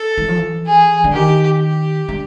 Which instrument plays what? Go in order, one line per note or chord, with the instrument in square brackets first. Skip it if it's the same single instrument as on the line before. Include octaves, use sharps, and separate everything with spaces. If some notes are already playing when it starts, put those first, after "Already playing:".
Already playing: [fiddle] A4
[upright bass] E3
F3
E3
[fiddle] G#4
[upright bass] D3
[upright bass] D#3 [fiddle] G4
[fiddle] G4
[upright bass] D3